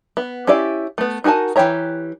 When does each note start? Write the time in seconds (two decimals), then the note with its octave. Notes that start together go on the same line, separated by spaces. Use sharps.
0.17 B3
0.47 C#4 E4 G4 D5 F5
0.98 A3 B3
1.24 D#4 F#4 A#4 G#5 A5
1.56 E3 C4 G4 C#5 A#5